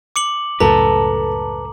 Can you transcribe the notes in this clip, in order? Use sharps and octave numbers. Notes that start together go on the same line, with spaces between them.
D6 C#7 F#7
C#2 F#2 A2 A4 B4 A5 A#5